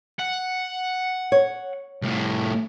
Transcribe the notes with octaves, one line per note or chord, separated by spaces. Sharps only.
F#5
C#5
C2 A2